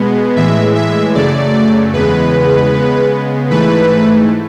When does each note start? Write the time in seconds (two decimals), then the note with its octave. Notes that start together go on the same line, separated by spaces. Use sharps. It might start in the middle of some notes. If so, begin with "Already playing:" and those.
Already playing: B2 G#3 B3
0.36 A2 E3 G#3 E5
0.75 E5
1.15 F#2 C#3 F#3 A3 D5
1.93 E2 C#3 G#3 B3 B4
2.72 C#3 G#3 B3
3.50 G#2 E3 A3 B4